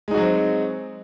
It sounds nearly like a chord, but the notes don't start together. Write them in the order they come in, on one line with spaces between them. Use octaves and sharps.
G#3 D#4 F#4 F#3 C4